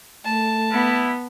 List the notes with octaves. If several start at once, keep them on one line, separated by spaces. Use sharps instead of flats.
A3 A5
B3 E4